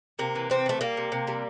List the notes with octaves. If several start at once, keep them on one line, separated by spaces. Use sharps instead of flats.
C3 A#3
E3
C3 C4
E3 A3
G3 A#3
C3
C3
G3